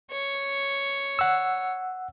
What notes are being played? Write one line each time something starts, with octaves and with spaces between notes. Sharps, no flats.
C#5
F#5 E6